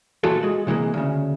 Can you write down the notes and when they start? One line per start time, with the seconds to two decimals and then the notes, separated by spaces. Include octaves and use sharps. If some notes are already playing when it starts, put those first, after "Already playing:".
0.24 A#2 E3 A3 F4 F#4 A4
0.43 G#3 F#4
0.67 C3 E3 G#3 A#3
0.94 D2 C#3